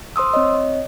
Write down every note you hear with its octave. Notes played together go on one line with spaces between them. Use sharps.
C5 C6 D#6 E6
C4 C#5 D#5